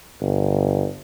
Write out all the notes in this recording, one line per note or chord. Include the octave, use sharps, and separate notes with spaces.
G1